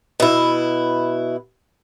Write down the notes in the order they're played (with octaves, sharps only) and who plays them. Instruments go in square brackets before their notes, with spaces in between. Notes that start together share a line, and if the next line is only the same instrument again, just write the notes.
[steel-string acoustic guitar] B2 E4